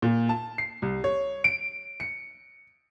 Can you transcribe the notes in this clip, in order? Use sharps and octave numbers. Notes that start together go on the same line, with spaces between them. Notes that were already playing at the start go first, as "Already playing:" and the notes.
A#2
A5
C7
C2
C#5
D7
C#7